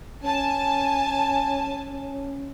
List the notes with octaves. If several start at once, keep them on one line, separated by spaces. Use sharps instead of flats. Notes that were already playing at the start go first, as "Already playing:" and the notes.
C#4 G#5 A5